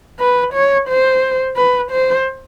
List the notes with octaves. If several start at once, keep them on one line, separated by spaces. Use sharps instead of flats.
B4
C#5
C5
B4
C5